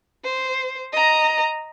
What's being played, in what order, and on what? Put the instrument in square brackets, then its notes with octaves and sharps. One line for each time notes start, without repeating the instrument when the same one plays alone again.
[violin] C5
D#5 A#5